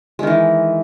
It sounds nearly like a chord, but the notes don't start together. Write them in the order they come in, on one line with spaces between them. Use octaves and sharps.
G#3 D#3 E3